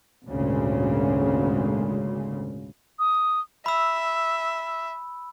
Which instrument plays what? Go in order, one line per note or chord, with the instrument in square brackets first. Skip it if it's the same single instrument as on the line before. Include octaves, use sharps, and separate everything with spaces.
[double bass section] G#1 D2 A#2 C#3 G#3
[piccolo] D#6
[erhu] E5 [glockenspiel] B5 E6